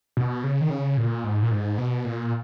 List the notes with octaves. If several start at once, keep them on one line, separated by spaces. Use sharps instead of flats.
B2
C#3
D#3
C#3
A#2
G#2
A#2
G#2
B2
A#2